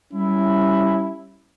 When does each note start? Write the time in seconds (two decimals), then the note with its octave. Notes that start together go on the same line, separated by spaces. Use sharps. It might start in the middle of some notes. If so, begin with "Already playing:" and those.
0.13 G3 C#4 E4